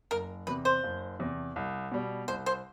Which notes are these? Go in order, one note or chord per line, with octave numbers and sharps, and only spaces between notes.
F#1 A#4
E2 C3 B4
C5
F#1
E2 C3
C2
B2 G3
C2 C5
C5